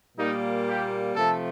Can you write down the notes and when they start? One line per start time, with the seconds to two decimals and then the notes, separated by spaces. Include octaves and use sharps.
0.17 A#2 G3 A#3 D#4
0.66 G4
1.15 C3 F3 A3 A4